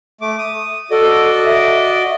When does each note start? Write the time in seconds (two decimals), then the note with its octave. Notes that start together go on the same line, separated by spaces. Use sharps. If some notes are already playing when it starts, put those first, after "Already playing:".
0.21 A3 D6
0.38 D#6
0.91 F#4 A4 D5 D#5
1.45 E5